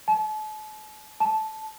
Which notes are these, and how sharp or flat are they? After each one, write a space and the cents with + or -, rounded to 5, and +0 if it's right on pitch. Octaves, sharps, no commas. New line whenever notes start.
A5 -40
A5 -10